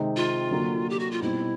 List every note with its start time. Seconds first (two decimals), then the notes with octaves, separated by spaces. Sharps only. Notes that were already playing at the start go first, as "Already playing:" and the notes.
Already playing: C3 D#3 G#3 C4 D#4
0.16 F4
0.51 D3 F#3 A#3
0.90 G4
0.99 F#4
1.11 F4
1.21 B2 G3 C4 D#4 E4